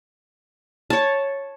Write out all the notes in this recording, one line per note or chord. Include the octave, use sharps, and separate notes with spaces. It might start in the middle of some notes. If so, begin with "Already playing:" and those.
C#5 A5